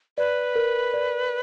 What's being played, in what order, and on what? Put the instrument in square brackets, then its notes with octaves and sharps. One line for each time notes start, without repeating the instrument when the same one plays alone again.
[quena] B4 [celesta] D5
[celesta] A#4
D5